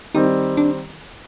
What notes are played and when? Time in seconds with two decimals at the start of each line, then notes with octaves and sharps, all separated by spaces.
0.15 D#3 G3 C4 D#4
0.57 D4